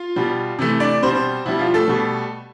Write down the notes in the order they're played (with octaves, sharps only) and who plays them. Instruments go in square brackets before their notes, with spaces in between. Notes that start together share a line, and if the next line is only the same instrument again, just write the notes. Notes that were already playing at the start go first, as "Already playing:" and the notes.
Already playing: [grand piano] F4 F5
B2 G3
C3 E3 A3
D4 D5
B2 G3 C4 C5
B2 G3 E4
F3 F4
A3 A4
B2 G3